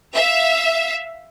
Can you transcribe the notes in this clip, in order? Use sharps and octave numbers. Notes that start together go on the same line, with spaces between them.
E5 F5